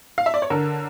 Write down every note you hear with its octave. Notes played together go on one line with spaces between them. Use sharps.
F5
E5
D5
C#5
D3 A#4